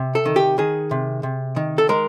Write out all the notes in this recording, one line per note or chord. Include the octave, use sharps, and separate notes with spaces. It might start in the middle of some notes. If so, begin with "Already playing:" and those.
Already playing: C3
A4
D#3
G4
D#3 G#4
C3
C3
D#3
A4
G#3 A#4